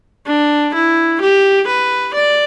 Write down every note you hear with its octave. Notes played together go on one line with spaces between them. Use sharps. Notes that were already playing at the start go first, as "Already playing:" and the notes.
D4
E4
G4
B4
D5